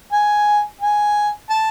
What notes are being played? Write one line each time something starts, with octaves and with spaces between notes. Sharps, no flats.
G#5
G#5
A5